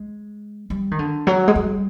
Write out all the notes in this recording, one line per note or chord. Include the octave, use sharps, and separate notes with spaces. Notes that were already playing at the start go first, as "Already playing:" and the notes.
Already playing: G#3
G3
D#3
D3
F#3
G#3
G3